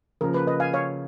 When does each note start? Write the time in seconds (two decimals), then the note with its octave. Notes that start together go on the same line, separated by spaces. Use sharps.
0.21 C#3 F3 A#3 A#4
0.34 B4
0.47 B4 D#5
0.60 F5 G#5
0.73 C#5 F5